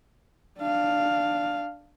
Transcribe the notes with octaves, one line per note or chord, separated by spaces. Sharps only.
D4 F5